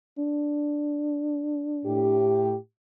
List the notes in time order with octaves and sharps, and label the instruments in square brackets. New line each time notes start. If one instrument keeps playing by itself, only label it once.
[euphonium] D4
[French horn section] A2 G4